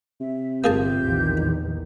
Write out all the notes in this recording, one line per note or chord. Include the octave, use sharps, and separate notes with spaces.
C3 E5
G1 A#3 F4 G4 G#4 A5 G6
A#1 E2 D#3